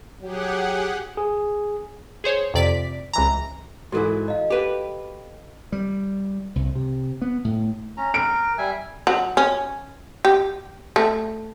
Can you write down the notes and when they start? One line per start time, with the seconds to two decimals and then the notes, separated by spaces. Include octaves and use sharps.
0.22 F#3 G4 G#4 F#5
1.17 G#4
2.24 G#4 C5 C#5
2.54 F2 C3 D5 B6
3.13 C#2 E3 A#5
3.92 G#2 E3 E4 F#4 A4 A#4
4.28 D#5 F5
4.50 G4 B4
5.72 G3
6.56 C2
6.75 C3
7.22 B3
7.45 A2
7.97 C#4 A#5
8.14 A#4 D7
8.58 G3 E5 G#5
9.07 F#3
9.37 C#4
10.25 G4
10.96 A3